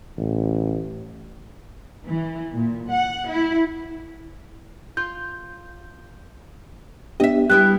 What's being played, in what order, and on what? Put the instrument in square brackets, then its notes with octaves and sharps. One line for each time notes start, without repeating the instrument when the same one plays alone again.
[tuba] A1
[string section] E3
A#2
F#5
E4
[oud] F4 [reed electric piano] G6
[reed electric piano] B3 D4 G4 [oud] D#5 E5
[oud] G3 B3 E4 [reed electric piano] G4